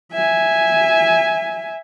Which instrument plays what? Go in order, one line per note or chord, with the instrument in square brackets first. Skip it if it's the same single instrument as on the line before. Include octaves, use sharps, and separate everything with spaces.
[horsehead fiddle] E5 G#5